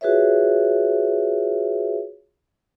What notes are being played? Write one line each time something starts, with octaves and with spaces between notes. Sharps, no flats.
F4 F#4 G#4 B4 C#5 E5